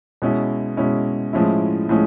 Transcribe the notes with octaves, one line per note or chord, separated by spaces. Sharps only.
B2 G#3 C#4 E4
B2 G#3 C#4 E4
A2 F3 G#3 C#4 E4
A2 F3 G#3 C#4